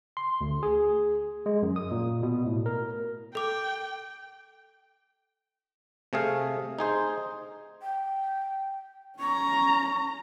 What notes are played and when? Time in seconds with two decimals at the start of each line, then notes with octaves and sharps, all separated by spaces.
0.17 C6
0.41 D2
0.63 G#4
1.46 G#3
1.63 F#2
1.76 D#6
1.91 A#2
2.23 B2
2.46 A2
2.66 A#4
3.35 A4 G5 D6
6.13 C3 A3 G#4 F5
6.79 D#4 G#4 C5
7.82 G5
9.19 C#4 A#5 C#6